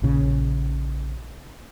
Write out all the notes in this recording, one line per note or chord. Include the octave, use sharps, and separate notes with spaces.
A#1 A#2 C#3